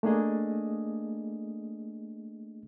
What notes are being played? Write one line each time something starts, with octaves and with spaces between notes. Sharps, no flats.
A3 A#3 D4 G#4 D#5